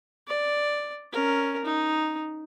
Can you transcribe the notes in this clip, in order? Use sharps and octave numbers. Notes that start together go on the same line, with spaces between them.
D5
C#4 A#4
D#4